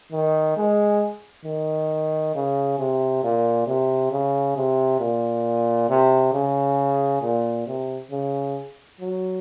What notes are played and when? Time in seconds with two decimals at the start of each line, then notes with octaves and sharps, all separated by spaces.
0.12 D#3
0.57 G#3
1.45 D#3
2.35 C#3
2.79 C3
3.23 A#2
3.67 C3
4.11 C#3
4.56 C3
5.00 A#2
5.89 C3
6.33 C#3
7.22 A#2
7.67 C3
8.11 C#3
9.01 F#3